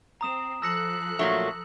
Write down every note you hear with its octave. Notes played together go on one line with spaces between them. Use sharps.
C4 A#5 D#6 E7
F3 A4 E6 F#6 A#6 C#7
A#2 F#3 A3